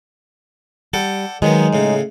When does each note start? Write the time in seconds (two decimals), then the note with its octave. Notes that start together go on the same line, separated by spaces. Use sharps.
0.93 G3 A4 F#5 G5
1.42 D#3 F#3 G#3 B3 D#4
1.73 A2 C#3